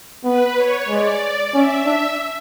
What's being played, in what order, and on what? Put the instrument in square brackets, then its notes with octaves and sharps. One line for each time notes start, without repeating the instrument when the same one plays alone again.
[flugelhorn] B3 [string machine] B4
[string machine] C#5
[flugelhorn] G#3 [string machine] D5
[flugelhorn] C#4 [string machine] E5
[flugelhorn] D4